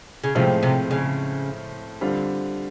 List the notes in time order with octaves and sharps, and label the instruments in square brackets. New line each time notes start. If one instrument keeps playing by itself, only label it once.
[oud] C#3
[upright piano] A2 F3 G#3 C4 F4 [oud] C3
[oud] C3
C#3
[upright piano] D3 G3 C4 F4